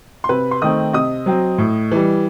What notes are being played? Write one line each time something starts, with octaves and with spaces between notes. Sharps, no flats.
C6
C3 B4 B5
C6
D#3 A3 C4 D#5 D#6
C3 D#5 D#6
F#3 C4
A2
E3 G3